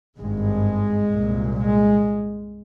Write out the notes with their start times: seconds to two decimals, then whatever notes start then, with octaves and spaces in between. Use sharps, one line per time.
0.18 G#1 G2 G#3
1.12 C2 A#2
1.58 G#3